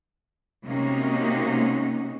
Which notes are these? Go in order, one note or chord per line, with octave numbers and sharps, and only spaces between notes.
C3 G#3 A#3 C#4 D#4 F#4